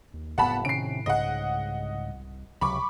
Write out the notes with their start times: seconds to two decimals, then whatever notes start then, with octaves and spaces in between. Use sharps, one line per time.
0.14 D#2
0.38 F#1 F2 A2 B3 F#5 A5 B5
0.65 C3 D#3 C#4 C7 D7
1.06 C2 G#2 C#3 D#5 F#5
2.61 C#2 C3 F#3 B5 C#6 D6